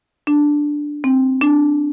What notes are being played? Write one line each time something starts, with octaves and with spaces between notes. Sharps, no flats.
D4
C4
D4